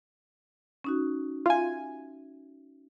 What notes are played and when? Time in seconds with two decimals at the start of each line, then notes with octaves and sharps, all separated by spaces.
0.84 C#4 D#4 F#4
1.46 F4 E5 G#5